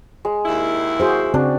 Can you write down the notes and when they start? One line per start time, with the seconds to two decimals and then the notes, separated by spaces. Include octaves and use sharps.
0.25 G#3
0.45 D#2 E4
1.00 F#4 G#4 C5
1.34 C#3 C4 D4 F#4